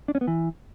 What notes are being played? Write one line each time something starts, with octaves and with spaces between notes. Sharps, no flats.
D4
C#4
B3
E3